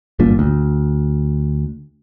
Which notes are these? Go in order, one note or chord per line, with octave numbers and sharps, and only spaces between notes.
G#1 G2 A#2 D4
D2